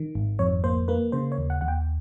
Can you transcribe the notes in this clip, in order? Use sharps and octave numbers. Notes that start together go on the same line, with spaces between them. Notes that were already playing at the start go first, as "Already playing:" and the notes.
Already playing: D#3
G#1
F2 C#5
A#3 C5
A#3 B4
C#3 C5
C#5
D#2
F#5
D#2 F#5
G5